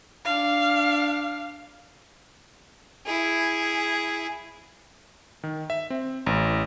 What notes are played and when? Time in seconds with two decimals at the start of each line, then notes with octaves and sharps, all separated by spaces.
0.24 D4 F5
3.06 E4 G#4
5.43 D#3
5.70 E5
5.90 C4
6.26 A1